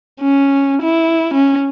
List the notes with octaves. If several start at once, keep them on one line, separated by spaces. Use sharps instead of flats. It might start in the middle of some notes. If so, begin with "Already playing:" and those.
C#4
E4
C#4